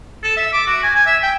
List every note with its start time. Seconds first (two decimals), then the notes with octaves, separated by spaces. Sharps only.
0.23 A4
0.37 E5
0.53 D6
0.67 F#4
0.83 G#5
0.96 G#5
1.07 E5
1.23 G5